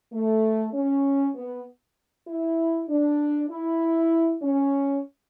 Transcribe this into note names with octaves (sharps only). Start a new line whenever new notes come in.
A3
C#4
B3
E4
D4
E4
C#4